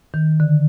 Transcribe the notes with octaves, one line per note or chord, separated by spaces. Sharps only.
D#3
D3